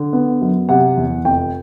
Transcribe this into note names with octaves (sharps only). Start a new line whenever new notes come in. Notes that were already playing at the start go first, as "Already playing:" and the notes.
Already playing: D3
B3
F#2
C3 F#5
E2
F1 G5